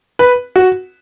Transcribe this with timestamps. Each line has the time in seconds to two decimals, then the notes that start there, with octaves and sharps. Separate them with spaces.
0.19 B4
0.56 F#4